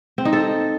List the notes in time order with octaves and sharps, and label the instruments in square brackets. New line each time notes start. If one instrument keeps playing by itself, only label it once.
[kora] C4
D#4
A4